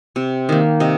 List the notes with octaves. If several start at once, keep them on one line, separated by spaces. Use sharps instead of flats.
C3
D#3 A#3
C3 D#5